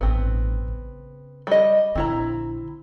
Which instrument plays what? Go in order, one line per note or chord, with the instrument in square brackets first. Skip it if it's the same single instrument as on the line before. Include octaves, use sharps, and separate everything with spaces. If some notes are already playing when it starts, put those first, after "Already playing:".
[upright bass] A1 G2 [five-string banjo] B3 C4
[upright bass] C#3
[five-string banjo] G3 D#5
[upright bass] A#1 D3 [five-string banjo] C4 E4 A#5